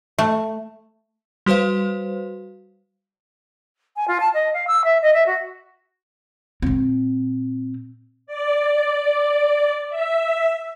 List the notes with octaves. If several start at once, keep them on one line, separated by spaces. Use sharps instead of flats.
A3
G3 F#4 B4 C5 F5
G#5
F4
A5
D#5
F5
E6
E5
D#5
E5
F#4
A#2 C4
D5
E5